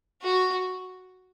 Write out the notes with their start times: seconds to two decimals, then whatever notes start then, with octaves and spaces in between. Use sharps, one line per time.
0.23 F#4